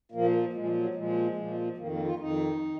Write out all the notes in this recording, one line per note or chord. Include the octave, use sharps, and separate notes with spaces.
A#2 F3 A#3
A#2 F3 G#3
F#3
A#2 F3 G#3
A#2 F3
F2 D#3 A#3
A#3
F4
F2 D#3 D#4
D#3